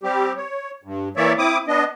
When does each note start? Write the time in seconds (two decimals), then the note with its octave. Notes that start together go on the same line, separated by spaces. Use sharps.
0.03 G3 C4 G4
0.36 C#5
0.83 G2
1.17 E3 A#3 C#5 D5 E5
1.38 C4 E4 D6 D#6
1.68 B3 D4 D#5